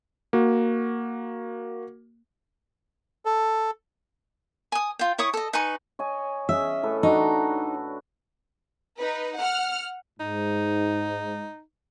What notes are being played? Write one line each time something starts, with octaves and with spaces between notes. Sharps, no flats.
A#3 F#4
A4
G#5 D#6
F4 G5
E4 C#5 C#6 D#6
A4 D#5
D#4 B4 G#5 C#6
C#5 D#5 G#5
C#4 G#4 D#5 E5
A2 A4 B4
D4 D#4 F#4 A5
D#4 B4
F#5 F6
G#2 D#4